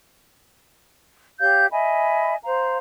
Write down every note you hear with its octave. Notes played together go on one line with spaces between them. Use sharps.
G4 C#5 F5 G6
D#5 E5 G#5 B5
C5 F5 A#5